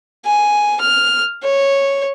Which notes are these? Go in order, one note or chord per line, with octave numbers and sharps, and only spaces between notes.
G#5
F6
C#5